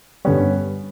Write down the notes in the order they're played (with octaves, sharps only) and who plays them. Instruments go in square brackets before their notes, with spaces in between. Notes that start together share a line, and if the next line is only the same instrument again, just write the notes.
[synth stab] G2 D3 G3 [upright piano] B3 C#4